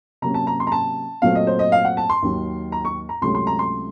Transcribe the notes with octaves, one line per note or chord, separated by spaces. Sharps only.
C3 F#3 A#3 C#4 A#5
A5
A#5
C6
A#5
A5
A#2 F#3 A3 C4 F5
D#5
C5
D#5
F5
F#5
A5
C6
D#2 D#3 F#3
A#5
C#6
A#5
C#2 C3 F#3 A3 C#4 C6
C6
A#5
C6